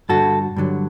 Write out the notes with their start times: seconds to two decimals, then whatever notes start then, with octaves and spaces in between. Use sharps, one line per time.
0.09 G2 D3 G3 F#4 A4
0.56 G2 D3 F#3